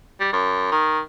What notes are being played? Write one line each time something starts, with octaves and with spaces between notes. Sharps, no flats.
G3
F#2
D#3